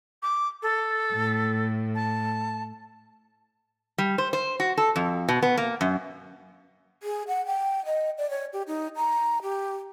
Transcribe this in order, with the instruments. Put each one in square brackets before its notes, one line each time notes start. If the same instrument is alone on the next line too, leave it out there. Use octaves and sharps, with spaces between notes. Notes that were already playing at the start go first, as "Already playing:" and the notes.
[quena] D6
A4
[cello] A2
[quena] A5
[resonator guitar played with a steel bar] G3
C5
C5
F#4
A4
F2
B2
B3
A#3
F#2
[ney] G#4
F#5
G5
D#5
D5
C#5
G4
D#4
A#5
G4